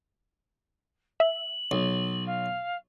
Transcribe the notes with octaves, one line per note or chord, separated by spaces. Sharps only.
E5 F#7
B1
F5